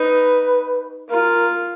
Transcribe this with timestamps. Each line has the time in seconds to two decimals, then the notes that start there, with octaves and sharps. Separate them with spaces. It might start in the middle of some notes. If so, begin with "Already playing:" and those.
Already playing: D#4 B4
1.10 F4 A#4